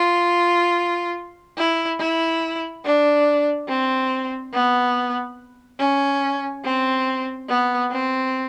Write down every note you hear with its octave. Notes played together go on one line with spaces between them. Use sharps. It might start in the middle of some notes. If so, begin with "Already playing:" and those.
Already playing: F4
E4
E4
D4
C4
B3
C#4
C4
B3
C4